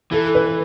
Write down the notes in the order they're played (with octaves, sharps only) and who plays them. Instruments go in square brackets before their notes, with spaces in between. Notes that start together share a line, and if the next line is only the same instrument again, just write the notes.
[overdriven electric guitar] E3 [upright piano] A4
[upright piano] B4